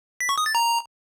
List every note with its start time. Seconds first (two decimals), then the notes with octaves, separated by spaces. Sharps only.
0.20 B6
0.29 C#6
0.38 D#6
0.46 A6
0.55 A#5